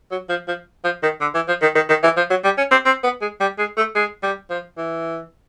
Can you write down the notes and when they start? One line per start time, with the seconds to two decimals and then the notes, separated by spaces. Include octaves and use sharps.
0.11 F#3
0.29 F3
0.48 F3
0.84 F3
1.03 D#3
1.21 D3
1.34 E3
1.48 F3
1.62 D#3
1.75 D#3
1.89 D#3
2.03 E3
2.17 F3
2.30 F#3
2.44 G3
2.58 C#4
2.71 C4
2.85 C4
3.03 B3
3.21 G#3
3.40 G3
3.58 G#3
3.77 A3
3.95 G#3
4.23 G3
4.50 F3
4.77 E3